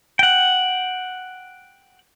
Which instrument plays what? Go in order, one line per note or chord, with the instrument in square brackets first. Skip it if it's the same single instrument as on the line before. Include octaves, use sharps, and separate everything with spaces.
[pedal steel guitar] F#5 G5